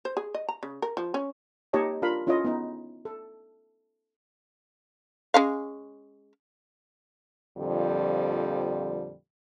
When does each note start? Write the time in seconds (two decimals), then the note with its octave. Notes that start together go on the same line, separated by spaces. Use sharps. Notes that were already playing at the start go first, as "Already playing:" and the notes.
0.05 C5
0.17 G#4
0.34 D#5
0.48 A#5
0.63 C#3
0.82 A#4
0.97 F3
1.14 C#4
1.73 A#3 D#4 G4 C#5 D#5 A5
2.02 D4 F4 A#4 F5 B5
2.27 C#4 E4 F4 A4 C#5 D#5
2.45 B3 D#4
3.05 A4
5.34 G#3 C#4 F5
7.58 F2 A#2 D3 F3 G3